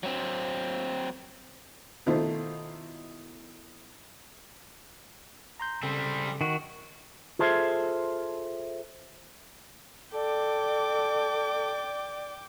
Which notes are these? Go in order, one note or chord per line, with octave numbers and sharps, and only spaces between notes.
F#3 C4
B2 D#3 A3 E4 F4 C5
A#5 C6 G6
C#3 G3 C4 A4
D#3 F#4
F4 G#4 A4 C5 E5
A4 D5 G5 D6